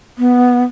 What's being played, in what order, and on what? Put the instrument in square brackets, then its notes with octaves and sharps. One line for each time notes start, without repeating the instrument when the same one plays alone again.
[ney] B3